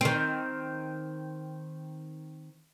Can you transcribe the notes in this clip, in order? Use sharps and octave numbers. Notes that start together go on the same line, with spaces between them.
D#3 C4